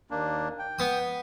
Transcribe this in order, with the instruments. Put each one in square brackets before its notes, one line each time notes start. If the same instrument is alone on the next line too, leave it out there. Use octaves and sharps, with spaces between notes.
[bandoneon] D#2 A#3 D4
G5
[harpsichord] B3 D#6